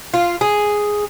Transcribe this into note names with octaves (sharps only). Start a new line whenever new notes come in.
F4
G#4